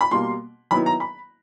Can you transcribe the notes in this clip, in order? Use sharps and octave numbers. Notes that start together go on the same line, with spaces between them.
B5
B2 G3 A#3 C6
D#3 F#3 B3 E4 B5
A#5
B5